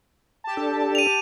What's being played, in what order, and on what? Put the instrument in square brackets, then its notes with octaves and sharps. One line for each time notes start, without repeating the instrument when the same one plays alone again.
[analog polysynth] G4 A5
[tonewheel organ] D4 A4
[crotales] D#7 F7